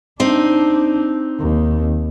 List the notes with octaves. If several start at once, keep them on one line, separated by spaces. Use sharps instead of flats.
C4 D4 D#4
D#2